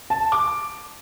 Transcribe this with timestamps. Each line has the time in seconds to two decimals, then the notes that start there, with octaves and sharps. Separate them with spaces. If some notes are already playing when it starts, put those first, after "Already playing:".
0.10 A5
0.32 D6